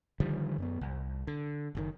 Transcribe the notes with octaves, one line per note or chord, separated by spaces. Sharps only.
D3 D#3 F3 G3
F#2 A#3 B3
C2
D3
F#1 B2 D#3